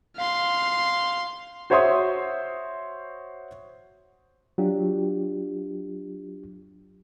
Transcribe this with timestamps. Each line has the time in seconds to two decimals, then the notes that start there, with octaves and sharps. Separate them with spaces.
0.16 F5 C6
1.70 F#4 C5 C#5 E5 C6 D#6
4.58 F#3 D4 F4 G4